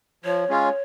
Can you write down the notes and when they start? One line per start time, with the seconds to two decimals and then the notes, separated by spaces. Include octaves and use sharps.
0.24 F3 C#5
0.50 G#3 C#4 F4